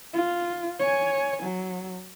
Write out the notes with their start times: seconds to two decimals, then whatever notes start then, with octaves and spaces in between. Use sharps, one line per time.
0.14 F4
0.80 C#5 G#5
1.43 F#3